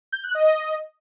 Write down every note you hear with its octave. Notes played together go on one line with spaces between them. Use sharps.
G6
F#6
D#5